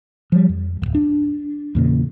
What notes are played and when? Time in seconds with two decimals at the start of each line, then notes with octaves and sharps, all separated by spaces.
0.32 F3 G3
0.49 F2
0.82 D1 D#2
0.95 D4
1.75 E2 A#2 C#3